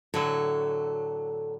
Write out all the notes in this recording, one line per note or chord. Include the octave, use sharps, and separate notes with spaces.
A2 D3 F#3 A4